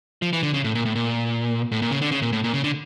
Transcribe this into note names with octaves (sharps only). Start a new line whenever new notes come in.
F3
E3
D3
C#3
A2
A#2
A2
A#2
A2
A#2
C#3
D3
C#3
A#2
A2
A#2
C#3
D3